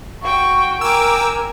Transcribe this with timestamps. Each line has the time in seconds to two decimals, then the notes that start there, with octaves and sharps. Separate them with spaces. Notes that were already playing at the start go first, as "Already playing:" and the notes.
0.22 F#4 G5 C#6
0.81 A#4 G5 G#5 D6 E6